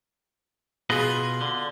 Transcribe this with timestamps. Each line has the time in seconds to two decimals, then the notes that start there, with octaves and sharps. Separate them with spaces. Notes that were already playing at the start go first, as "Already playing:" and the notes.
0.90 B2 F4 G#4 B4 D#5
1.41 D3